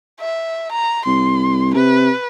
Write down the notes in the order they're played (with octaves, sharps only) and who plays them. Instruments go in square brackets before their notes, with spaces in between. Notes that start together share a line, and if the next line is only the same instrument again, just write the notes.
[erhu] E5
A#5
[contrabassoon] C2 [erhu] C6
[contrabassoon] C3 [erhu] B4